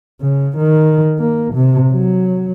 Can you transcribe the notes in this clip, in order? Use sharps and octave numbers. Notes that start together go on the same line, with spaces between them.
C#3
D#3
A#3
C3
F#3